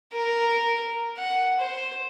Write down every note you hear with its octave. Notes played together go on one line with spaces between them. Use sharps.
A#4
F#5
C5